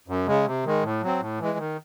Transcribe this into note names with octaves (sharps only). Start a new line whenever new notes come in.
F#2
C#3 G#3
C3
D#3 G#3
A2
F#3 C4
A2
E3 G#3
D#3